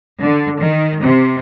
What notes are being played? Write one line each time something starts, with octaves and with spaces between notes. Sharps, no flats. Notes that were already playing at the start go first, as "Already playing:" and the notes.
D3
D#3
C3